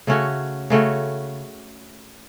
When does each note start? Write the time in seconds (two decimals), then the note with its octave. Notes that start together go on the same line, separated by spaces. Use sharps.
0.07 C#3 A3 C#4 F#4
0.70 C#3 A3 C#4 F#4